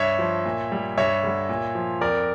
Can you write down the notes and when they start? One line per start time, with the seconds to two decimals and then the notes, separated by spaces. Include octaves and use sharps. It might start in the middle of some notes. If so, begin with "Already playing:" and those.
Already playing: G2 C#5 E5
0.19 F3
0.45 A#2
0.72 G3
0.98 G2 C#5 E5
1.23 D3 G3
1.49 A#2
1.75 F3
2.01 F2 A#4 D5